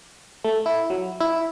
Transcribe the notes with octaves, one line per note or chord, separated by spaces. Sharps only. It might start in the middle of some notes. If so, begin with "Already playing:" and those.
A3
E4
F#3
E4